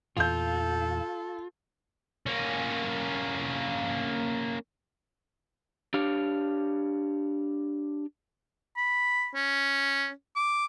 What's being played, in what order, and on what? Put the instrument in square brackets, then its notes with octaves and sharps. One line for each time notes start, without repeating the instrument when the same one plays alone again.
[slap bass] E2 A#2 E3 [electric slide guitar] F4 [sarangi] A4 [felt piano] F5 G6
[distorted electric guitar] A#3 C#4
[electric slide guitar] D4 G4 C#5 F5
[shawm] B5
C#4
D6